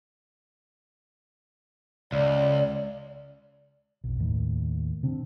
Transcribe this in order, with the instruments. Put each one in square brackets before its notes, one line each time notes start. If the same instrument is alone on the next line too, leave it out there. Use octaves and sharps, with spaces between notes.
[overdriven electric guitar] C#2 [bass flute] D5
[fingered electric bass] F1 B1
D#2 A2
C3 C4 D4